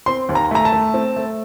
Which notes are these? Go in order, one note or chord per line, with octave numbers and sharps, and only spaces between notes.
C4 C6
D#2
A#5
A3 A#5
A5
A3
C4
A3